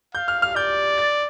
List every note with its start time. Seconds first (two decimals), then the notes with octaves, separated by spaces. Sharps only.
0.15 F5 G6
0.28 F6
0.42 F6
0.55 D5 G6
0.98 A6